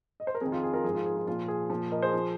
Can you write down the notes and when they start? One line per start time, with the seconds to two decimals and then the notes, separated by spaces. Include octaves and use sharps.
0.20 D#5
0.27 C5
0.35 A#4
0.41 F2 D#3 G#4
0.52 F4
0.63 G#4
0.73 F4 A#4
0.84 G#2 F3 G#4
0.95 F4
1.06 G#4
1.17 F4
1.27 A#2 F3 F4
1.48 G#4
1.70 A#2 F3
1.92 A#4 D#5
2.02 G#4 C5
2.14 F3